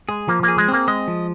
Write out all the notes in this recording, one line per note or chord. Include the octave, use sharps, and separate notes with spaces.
G#3 G#4
F3 A#3
A#3 G#4
G#3
C4
A#3
G#3 D#5
F3